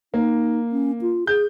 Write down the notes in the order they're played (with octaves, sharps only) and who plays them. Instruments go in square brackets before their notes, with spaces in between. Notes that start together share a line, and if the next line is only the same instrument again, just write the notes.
[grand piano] A#3 [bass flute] D#4
[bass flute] C#4
F4
[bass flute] G#4 [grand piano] G6